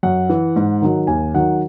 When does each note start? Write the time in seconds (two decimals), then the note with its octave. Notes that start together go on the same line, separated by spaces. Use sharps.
0.03 F#2 F#5
0.30 E3
0.56 G#2
0.82 D#3 F#3
1.07 D#2 G#5
1.34 D#3 F#3 F#5